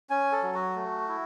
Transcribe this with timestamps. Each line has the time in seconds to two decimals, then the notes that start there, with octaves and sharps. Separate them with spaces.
0.10 C#4 G#5
0.32 A4
0.43 F#3
0.54 F#4
0.76 A3
1.08 E4